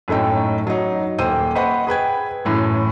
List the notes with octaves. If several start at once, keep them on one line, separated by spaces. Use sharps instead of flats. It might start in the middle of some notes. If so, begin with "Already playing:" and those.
F#2 A2 A3 D#4 G5
F#3 D#4
D#1 A#3 C5 G5 E6 D#7
B4 C5 D#5 F#5 B5 C#6
G#4 B4 G5 G#6
F#2 A2 E3